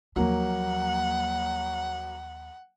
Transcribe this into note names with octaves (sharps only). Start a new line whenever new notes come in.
D#2 F3 F#3 A#3 F#5